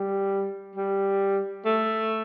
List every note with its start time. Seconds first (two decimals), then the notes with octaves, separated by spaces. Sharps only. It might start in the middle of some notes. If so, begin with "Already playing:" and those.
Already playing: G3
0.75 G3
1.65 A3